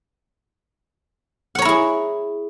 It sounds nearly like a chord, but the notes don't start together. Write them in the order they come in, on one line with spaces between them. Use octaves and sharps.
F#5 C#5 A#5 E4 G#4